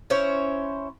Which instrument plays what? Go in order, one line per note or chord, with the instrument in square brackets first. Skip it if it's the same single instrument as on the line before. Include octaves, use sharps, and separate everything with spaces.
[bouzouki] C#4 E4 C5 C#5